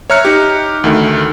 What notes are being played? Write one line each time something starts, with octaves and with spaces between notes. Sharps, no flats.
C#5 E5 A#5 F6 F#6 C#7
D#4 G4
D2 D#3 A3